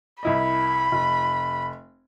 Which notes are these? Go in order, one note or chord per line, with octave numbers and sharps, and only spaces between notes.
C2 E4 D#5 B5
F1